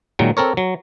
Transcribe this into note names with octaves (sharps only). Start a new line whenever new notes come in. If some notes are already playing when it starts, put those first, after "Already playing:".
A#2 D#3 F#3 G#3
C4 A4 A#4 C#5
F#3